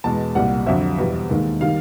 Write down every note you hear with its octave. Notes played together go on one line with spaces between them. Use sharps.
E2 B2 G#3 A5
C2 A#2 G3 F#5
F2 D3 F#3 E5
E2 B2 G3
D#2 D#3 G#3
D#3 G3 F5